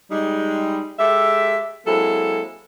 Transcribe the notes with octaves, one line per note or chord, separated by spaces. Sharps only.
G3 G#3 D#4
G#3 G4 A4 E5
F#3 G#3 A#3 C4 E4 A4